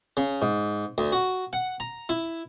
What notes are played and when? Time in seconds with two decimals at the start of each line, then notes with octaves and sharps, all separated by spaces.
0.17 C#3
0.42 G#2
0.98 D2
1.12 F#4
1.53 F#5
1.80 A#5
2.09 E4